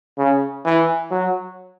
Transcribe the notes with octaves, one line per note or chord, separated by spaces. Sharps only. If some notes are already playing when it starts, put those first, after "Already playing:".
C#3
E3
F#3